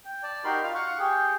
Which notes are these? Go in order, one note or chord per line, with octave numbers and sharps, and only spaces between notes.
G5
D5 A5
D#4 F#4 G4 A#4 B5 C6
F4 F5 F6
F5 F#5 C#6
G4 G#4 G5